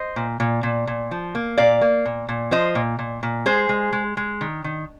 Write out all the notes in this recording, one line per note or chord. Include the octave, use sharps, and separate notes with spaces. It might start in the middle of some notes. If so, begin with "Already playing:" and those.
Already playing: C5 D#5
A#2
A#2
A#2
A#2
F3
A#3
A#2 D5 F5
A#3
A#2
A#2
F3 C5 D#5
A#2
A#2
A#2
G#3 G#4 C5
G#3
G#3
G#3
D#3
D#3